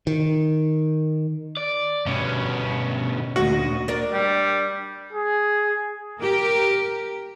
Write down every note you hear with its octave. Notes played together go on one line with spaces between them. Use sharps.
D#3
D5
G2 B2 C#4
D2 A#2 F#4 D#5
D4 A#4 D5
G3
G#4
G4 A#4